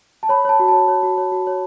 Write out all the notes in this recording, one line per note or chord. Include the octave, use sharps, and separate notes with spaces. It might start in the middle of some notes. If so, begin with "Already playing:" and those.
A5
C#5 B5
C#5 A5
F#4
C#5 A5
C#5
F#4
C#5
F#4
C#5